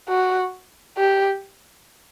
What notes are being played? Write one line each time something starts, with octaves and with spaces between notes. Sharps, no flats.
F#4
G4